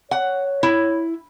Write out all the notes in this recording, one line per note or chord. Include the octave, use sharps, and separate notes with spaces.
C#5 F#5
E4